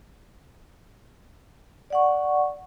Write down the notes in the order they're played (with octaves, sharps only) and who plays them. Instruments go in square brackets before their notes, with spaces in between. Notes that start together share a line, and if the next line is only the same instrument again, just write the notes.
[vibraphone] D5 F#5 C#6